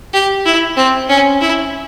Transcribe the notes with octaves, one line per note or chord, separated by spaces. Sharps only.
G4
E4
C4
C#4
E4